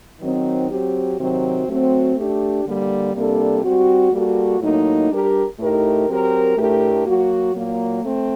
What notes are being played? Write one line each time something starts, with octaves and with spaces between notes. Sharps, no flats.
D#3 F#3 C4 D#4
F#3 C4 G4
C3 D#3 F#3 C4 F#4
F#3 A3 C4 F#4
A3 D4 G4
D3 G3 A#3
C3 G3 A#3 D4 A4
G3 C4 F#4
G3 A#3 F#4 A4
A2 F#3 A#3 D#4
G3 D4 G4 A#4
A2 A3 D#4 G4 A#4
F#3 C4 G4 A#4
A2 A3 D4 G4 A#4
F#3 A#3 F#4
A#2 F#3 A#3
A3 C4